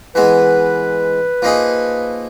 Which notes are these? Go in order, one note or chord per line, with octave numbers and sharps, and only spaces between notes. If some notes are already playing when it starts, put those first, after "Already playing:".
E3 G#3 B3 B4
F3 A#3 D#4 G#4